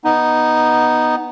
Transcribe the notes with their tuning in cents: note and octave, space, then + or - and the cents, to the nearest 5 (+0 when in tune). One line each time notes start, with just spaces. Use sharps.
B3 +0 D#4 +0